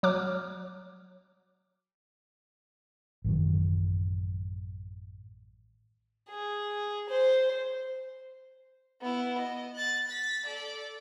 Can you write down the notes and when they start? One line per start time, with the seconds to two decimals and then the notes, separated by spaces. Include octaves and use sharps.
0.03 F#3 D6 F6
3.24 A1 F#2 D#3
6.29 G#4
7.09 C5
9.02 B3 E4
9.38 D#5
9.75 F#6 A6
10.08 A6 B6
10.46 A4 D5